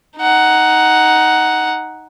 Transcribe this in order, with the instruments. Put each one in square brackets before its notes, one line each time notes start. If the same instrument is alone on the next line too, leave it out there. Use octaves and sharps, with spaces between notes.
[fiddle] D#4 F#5